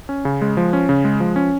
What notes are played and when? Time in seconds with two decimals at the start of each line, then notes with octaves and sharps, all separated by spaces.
0.09 C#4
0.25 C#3
0.42 G#3
0.57 F3
0.73 C#4
0.89 C#3
1.05 G#3
1.20 F3
1.36 C#4